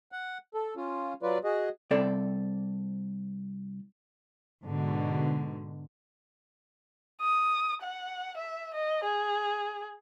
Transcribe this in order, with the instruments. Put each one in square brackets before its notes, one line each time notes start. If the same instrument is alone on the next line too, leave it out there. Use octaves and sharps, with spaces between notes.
[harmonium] F#5
A4
C#4 F4
F#3 F4 B4 D5
F#4 G#4 D#5
[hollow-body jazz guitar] C2 C4 A4 D5
[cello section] G#2 B2 D3
[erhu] D#6
F#5
E5
D#5
G#4